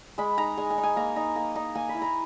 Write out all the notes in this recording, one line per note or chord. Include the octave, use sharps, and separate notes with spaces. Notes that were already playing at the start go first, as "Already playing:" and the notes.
G#3 B5
D#4 A#5
G#3 G#5
G#5
D#4
G#5
A#3 A#5
D#4 A#5
A#3 A#5
D#4 A#5
A#3 G#5
B5
E4
A#5